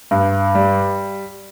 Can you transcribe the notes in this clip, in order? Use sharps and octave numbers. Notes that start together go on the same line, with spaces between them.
G2
G3